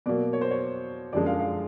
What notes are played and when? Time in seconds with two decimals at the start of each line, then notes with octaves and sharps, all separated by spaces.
0.06 B2 F#3 A#3 D5
0.33 C#5
0.41 C5
0.51 C#5
1.13 F#2 D3 F3 G#3 D5
1.26 F5
1.39 F5